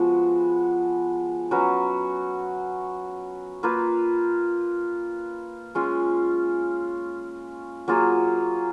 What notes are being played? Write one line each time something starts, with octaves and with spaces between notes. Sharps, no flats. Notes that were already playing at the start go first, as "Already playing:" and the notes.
Already playing: F3 G#3 B3 F#4
F#3 C#4 F#4 B4
A#3 F4 B4
G#3 C#4 F4
F#3 A#3 F4 G#4